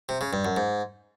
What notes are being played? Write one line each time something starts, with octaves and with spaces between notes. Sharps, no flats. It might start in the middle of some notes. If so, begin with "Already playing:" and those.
C3
C#3
G2
F#2
G#2